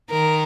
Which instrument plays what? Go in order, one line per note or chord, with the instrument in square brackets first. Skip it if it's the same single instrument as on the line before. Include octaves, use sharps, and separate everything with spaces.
[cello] D#3 [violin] A#4